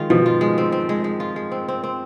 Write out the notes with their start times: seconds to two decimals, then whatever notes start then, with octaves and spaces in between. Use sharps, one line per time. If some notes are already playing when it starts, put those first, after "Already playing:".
Already playing: D#3 G#3 F4
0.10 B2 F3
0.26 F4
0.41 G#3
0.58 C4
0.72 C4
0.89 G#3
1.04 G#3
1.20 F4
1.36 G#3
1.51 C4
1.68 C4
1.84 C4